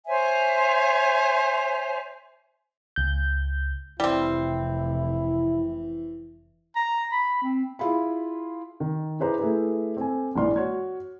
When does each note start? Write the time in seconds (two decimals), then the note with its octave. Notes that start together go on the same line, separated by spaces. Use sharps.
0.07 C5 C#5 E5 G#5
2.96 C#2 G6
4.00 F1 E3 G3 C4 E4
6.76 A#5
7.12 B5
7.42 C4
7.79 E4 F4 G#4 B5
8.80 D#3
9.19 E4 G#4 B4 C5 A#5 D6
9.39 A3 E4 G#4 B4
9.97 C4 A4 G#5
10.35 A#1 G#2 E3 D5 C6 F6
10.56 F#4 C#5 G#6